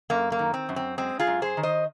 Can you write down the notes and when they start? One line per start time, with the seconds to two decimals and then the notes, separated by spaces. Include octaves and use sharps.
0.10 F#2 A#3
0.32 A#3
0.39 D#3
0.54 C4
0.69 F#2
0.76 C4
0.98 G#3 C4
1.19 F4 G#4
1.27 F#2
1.42 G#4 C5
1.57 D#3
1.63 C5 D#5